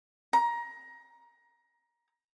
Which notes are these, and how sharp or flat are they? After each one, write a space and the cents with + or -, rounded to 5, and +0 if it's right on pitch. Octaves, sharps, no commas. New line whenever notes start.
A#5 +20